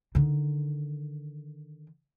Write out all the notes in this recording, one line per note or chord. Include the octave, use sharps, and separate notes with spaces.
D3 D#3